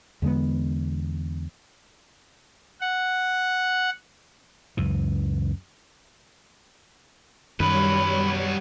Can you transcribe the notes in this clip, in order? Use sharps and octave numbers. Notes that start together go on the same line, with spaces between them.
E2 D3 G#3 B3
F#5
C#2 F#2 E3
F#2 D#3 F#3 G3 B4 C#5 B5